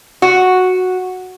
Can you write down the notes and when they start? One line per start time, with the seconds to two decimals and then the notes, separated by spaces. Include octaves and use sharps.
0.22 F#4